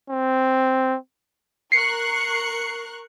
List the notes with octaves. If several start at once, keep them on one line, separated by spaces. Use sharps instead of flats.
C4
A#4 C#6 F#6 C7 C#7